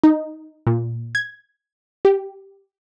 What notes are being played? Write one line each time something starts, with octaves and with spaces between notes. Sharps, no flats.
D#4
A#2
G#6
G4